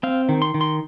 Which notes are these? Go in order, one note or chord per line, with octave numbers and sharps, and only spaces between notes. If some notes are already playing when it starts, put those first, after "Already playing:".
C4 F5
D#3
C6
D#3
C6